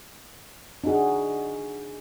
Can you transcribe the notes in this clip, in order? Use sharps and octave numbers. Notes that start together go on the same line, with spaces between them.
D4 D#4 F#4 G#4